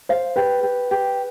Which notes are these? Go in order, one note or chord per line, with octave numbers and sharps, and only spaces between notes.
C5 F5
G4 B4
G4
G4